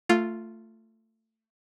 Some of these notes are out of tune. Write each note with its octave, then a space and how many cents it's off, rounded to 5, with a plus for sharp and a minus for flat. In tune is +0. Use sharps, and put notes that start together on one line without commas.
A3 +20 F4 +0